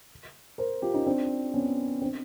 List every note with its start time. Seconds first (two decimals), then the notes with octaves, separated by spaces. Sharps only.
0.58 A#4 C5
0.82 F4 G4
0.94 C#4 D#4
1.06 C4 D4
1.54 B3 C#4
2.01 C4 D4